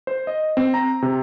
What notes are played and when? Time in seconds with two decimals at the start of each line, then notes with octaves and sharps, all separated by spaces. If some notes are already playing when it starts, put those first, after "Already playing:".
0.07 C5
0.27 D#5
0.57 C4
0.74 A#5
1.02 C3